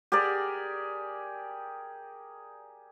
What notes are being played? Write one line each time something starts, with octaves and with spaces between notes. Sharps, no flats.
G4 G#4 A#4 D5